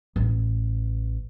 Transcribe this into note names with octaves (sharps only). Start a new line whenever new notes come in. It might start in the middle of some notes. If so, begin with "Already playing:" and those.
A1